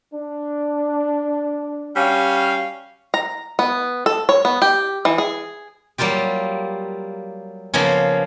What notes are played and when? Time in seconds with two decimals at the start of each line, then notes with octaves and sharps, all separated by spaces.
0.13 D4
1.97 G3 C#4 F#4 F5
3.14 A#5
3.59 B3
4.06 A4
4.29 C#5
4.45 B3
4.62 G4
5.05 E3
5.18 G#4
5.98 F#3 G3 A#3 F4 G4
7.74 C#3 F3 A#3 B3 C#4